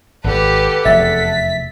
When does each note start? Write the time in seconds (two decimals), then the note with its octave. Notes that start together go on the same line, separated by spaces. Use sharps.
0.24 G#1 G4 A4 B4 F#5
0.85 F1 E2 E5 A6 B6